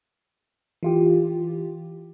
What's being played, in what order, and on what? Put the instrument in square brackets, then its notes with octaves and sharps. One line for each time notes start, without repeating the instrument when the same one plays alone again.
[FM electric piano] E3 F4 G4